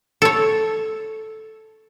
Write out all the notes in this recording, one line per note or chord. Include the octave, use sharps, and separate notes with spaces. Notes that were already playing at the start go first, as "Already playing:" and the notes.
A4 C#5